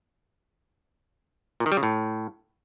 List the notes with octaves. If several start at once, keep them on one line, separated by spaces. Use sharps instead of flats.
A#2
D#3
G3
C#3
A2